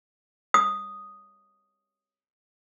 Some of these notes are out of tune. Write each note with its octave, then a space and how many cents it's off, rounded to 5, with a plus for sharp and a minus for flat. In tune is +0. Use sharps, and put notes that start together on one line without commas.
D#6 +0